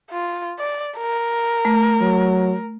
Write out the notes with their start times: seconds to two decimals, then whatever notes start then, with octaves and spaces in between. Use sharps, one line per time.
0.11 F4
0.59 D5
0.98 A#4
1.65 A3
2.01 F#3